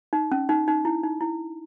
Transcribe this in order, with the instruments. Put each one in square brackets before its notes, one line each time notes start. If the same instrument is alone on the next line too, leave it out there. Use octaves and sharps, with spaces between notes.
[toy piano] D#4
C#4
D#4
D#4
E4
D#4
E4